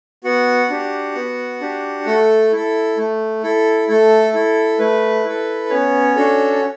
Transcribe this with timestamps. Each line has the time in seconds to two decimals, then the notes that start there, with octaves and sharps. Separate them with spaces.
0.24 B3 F#4 F#5
0.69 D4 G4
1.15 B3
1.61 D4 G4
2.06 A3 A4
2.52 E4 A4
2.97 A3
3.43 E4 A4
3.88 A3 A4
4.34 E4 A4
4.79 A3 B4
5.24 E4 A4
5.70 B3 C#4 C#5
6.16 D4 F#4 A4